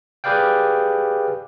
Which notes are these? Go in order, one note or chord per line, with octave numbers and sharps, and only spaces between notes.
G4 G#4 B4 D5 F5 G5